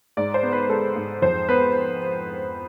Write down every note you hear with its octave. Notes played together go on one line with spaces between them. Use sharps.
G#2 D5
C5
B3
B4
G#3 A4
G#2
F2 C5
B3 B4